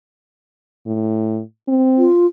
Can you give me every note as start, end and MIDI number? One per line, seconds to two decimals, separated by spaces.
0.87 1.41 45
1.68 2.07 60
1.98 2.26 65